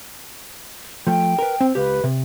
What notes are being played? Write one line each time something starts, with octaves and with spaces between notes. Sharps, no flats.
F3 A3 G5
A#4 B4
C4
C#2 G4 B4
C3